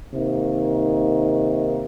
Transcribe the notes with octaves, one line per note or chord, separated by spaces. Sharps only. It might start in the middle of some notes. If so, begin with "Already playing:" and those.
C3 D#3 A#3 D#4